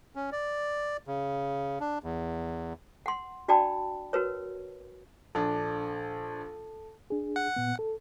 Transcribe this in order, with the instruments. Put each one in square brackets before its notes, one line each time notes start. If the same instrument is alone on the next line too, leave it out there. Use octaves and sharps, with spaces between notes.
[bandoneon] C#4
D5
C#3
D4
E2
[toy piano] F#5 C6
D4 F#4 D5 G5 A5 B5
F#4 A#4 B4 C#5
[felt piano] A#1 D4 [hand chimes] A4 A5
[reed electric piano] D4 G#4
[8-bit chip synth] F#5
[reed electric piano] A#2 B3
A4